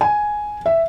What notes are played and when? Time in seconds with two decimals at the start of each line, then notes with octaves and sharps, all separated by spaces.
0.01 G#5
0.66 E5